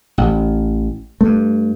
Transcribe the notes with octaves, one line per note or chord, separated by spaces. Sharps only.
A1
G2 A3